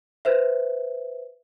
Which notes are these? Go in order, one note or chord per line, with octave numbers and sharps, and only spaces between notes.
B4 C5 E5